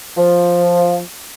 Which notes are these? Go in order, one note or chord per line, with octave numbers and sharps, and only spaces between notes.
F3